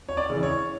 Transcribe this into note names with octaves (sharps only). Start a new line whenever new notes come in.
C#5
D5
C#3 E3
C#5